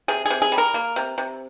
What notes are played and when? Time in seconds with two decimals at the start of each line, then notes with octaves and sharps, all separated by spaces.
0.08 C3 G#4
0.25 C3 G#4
0.42 G#4
0.52 G3
0.58 A#4
0.74 A#3
0.96 C3
1.18 C3